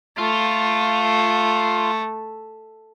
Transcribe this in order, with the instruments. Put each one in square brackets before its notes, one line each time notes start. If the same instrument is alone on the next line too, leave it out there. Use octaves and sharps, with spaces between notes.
[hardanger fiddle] A3 [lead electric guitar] F4